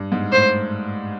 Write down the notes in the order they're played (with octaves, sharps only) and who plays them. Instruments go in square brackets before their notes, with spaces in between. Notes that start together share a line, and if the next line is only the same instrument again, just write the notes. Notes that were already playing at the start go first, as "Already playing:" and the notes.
Already playing: [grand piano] G2
G#2
[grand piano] A2 [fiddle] C5